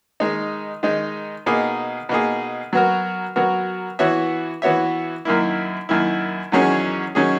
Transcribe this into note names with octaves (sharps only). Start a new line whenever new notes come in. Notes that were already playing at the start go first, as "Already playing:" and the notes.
D#3 G#3 D#4
D#3 G#3 D#4
B2 A#3 D#4 G#4
B2 A#3 D#4 G#4
F#3 B3 F#4 A#4
F#3 B3 F#4 A#4
E3 B3 F#4 C#5 E5
E3 B3 F#4 C#5 E5
F#2 D#3 A#3 E4
F#2 D#3 A#3 E4
E2 D#3 F#3 C#4 G#4
D#3 F#3 C#4 G#4